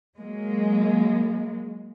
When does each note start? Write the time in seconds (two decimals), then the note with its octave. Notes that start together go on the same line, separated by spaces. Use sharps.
0.18 F#3 G#3 A#3